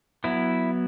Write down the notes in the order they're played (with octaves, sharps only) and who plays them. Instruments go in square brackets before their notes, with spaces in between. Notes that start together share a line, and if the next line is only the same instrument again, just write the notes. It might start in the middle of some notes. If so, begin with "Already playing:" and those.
[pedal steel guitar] F#3 B3 E4